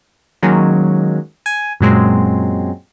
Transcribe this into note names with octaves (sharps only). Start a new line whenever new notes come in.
D#3 F#3 G#3 A#3 C#4
G#5
F#2 A#2 F#3 G#3 C4